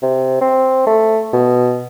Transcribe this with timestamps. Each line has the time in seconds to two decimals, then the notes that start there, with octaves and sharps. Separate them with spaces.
0.02 C3
0.41 C4
0.87 A3
1.33 B2